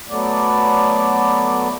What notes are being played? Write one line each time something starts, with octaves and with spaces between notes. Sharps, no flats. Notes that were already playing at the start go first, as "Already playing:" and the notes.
F#3 A3 B3 D5